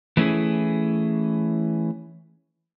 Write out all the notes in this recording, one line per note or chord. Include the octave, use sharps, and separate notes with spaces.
E3 A3 C#4 E4 G#4